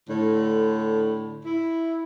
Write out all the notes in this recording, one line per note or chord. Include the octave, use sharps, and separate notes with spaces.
A2 D3
E4